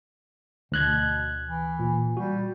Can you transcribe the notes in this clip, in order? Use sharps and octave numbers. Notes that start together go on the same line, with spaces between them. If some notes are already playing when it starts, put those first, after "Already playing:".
D2 B2 F#6 G#6
E3
A#2
G3 F#4